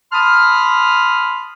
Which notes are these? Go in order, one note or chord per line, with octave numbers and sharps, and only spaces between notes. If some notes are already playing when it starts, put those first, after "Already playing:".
A5 B5 C6 D#6 F6